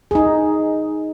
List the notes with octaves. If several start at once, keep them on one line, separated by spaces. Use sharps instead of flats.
D#4 G#4